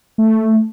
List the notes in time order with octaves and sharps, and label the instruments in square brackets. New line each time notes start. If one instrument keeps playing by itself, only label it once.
[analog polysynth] A3